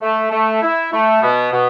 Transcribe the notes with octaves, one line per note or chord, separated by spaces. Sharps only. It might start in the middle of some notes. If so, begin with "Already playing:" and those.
A3
A3
E4
A3
B2
B2